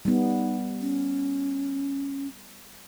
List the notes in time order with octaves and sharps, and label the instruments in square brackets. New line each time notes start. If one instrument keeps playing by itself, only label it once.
[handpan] G3 B3 [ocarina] D#4
[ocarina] C#4